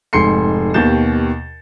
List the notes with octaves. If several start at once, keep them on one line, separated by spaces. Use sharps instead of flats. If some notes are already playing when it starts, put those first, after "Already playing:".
F1 G#2 C6 C7 C#7
D#2 B2 G4 G6 A6 E7